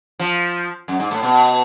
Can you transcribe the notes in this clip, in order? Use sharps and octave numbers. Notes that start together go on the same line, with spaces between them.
F3
F#2
G#2
A2
B2